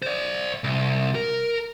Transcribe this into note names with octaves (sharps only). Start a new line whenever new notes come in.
C5 D5
C2
A#4